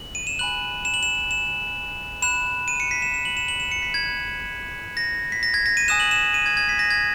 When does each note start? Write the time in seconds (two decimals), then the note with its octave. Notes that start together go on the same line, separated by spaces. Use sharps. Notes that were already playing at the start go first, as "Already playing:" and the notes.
Already playing: F#7
0.15 D#7
0.27 E7
0.39 G#5 B5 F#6 F#7
0.85 E7
0.94 F#7
1.03 E7
1.31 E7
2.22 B5 F#6 E7
2.68 D#7
2.80 C#7
2.91 B6
3.02 E7
3.14 E7
3.25 F#7
3.37 E7
3.48 F#7
3.60 E7
3.71 C#7
3.82 B6
3.94 G#6
4.06 B5 F#6
4.97 A#6
5.32 B6
5.43 A#6
5.54 G#6
5.66 A#6
5.77 D#7
5.88 G#5 D#6 F#6 E7
6.00 F#7
6.11 E7
6.34 D#7
6.46 G#6
6.57 G#6
6.69 B6
6.79 A#6
6.90 G#6